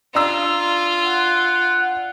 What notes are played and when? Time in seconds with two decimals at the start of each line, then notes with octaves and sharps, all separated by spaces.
0.15 D4 F4 A#5 E6
1.03 F#5